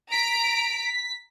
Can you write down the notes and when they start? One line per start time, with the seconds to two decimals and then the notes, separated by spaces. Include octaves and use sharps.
0.12 A#5 B6 D7